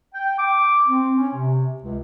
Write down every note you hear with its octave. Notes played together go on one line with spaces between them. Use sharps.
G5
D6
C4
C#4
C3
C#2